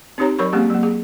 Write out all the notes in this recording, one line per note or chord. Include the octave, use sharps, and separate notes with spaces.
C4 D#4 G4 C#5 A#5
F#3 A#4 C#5 B5 C#6
G#3 A#3 C4 C#4 G4 G#4
F#3 A#3
G#4